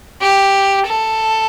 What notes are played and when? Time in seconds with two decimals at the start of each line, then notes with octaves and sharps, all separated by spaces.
0.21 G4
0.86 A4